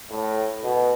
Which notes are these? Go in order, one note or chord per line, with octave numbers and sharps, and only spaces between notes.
A2
B2